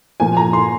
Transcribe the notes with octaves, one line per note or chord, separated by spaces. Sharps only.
A#2 F3 A#3 G#5
A#5
C6